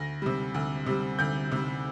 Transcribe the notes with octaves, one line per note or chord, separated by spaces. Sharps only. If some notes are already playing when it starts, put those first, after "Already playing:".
Already playing: D2 A#6
C3 G3
D2
C3 G3
D2 G6
C3 G3